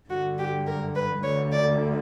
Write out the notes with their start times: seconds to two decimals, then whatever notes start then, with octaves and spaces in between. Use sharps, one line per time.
0.10 G2 D3 F#4
0.38 G4
0.67 A#4
0.95 B4
1.22 D2 D3 C#5
1.52 D5